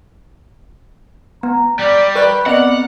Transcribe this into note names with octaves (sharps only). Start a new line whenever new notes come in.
B3 A#5
G3 D5
A#4 B4 D5 C#6 F#6
B3 C4 D5 D#5 F#5 F7